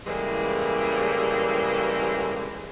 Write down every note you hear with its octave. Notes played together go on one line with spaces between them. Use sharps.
A2 C#3 E3 G3 G#3 A#3